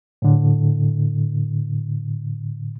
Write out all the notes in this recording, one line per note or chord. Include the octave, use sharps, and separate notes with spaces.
A2 D3